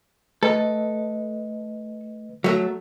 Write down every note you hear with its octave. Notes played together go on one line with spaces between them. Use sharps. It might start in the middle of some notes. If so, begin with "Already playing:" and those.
A3 A4 B4 D#5
F#3 A3